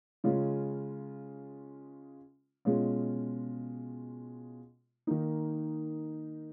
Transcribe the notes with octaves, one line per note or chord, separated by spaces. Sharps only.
C#3 G#3 C#4 F4
B2 G#3 C#4 F4
D#3 A#3 D#4